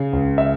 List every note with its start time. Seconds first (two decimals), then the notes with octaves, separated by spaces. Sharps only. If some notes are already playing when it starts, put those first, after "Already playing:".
Already playing: C#3
0.13 C#2
0.38 E5